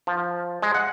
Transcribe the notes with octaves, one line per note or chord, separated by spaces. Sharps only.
F3
G#3
F#5